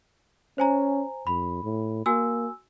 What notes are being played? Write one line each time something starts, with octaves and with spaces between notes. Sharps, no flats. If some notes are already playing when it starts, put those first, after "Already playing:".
C#4 C5 G#5 A#5
F2 B5
A2
A#3 F#4 G#5 E6